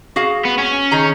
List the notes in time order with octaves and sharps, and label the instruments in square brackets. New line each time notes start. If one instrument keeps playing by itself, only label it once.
[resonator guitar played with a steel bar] F#4 G#4 F5
[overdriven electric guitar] B3
C#4
[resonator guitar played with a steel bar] D#3 G#4 A#5